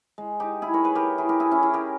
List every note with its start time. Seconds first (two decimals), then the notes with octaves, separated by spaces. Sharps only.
0.18 G#3
0.40 D#4 G4
0.62 E4 G#4
0.74 A#4 C#5
0.84 G#4 B4
0.95 G4 A#4
1.18 E4 G#4
1.29 G4 A#4
1.40 E4 G#4
1.51 C#4 E4
1.63 E4 G#4
1.73 G4 A#4